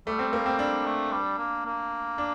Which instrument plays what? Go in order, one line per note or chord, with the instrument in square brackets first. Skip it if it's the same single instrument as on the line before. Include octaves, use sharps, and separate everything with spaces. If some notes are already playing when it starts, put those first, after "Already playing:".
[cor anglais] G3 [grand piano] A3
[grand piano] C4
A#3
C4
[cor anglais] G3 [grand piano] D4
[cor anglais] A3
G3
A#3
A#3
[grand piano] D4